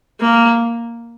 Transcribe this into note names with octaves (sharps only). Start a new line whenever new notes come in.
A#3